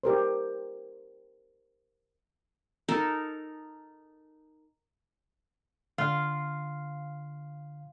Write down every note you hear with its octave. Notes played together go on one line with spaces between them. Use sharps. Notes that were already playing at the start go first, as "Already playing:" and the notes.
G4 A#4 C5
D#4 A4 A#4
D3 F4 F5